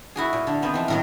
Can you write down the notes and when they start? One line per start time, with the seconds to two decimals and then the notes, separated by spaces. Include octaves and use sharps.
0.16 E4 F#4 G#4
0.33 A#2
0.47 D3
0.62 D#3 B3 C4
0.74 E3 F3
0.88 A2 D#3 F#3